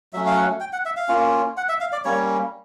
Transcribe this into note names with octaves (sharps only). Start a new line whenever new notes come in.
F#3 A3 C#4 E5
F5
F#5
G5
F#5
E5
F5
A#3 C#4 F4
F#5
E5
F5
D5
G3 A#3 C#4 C#5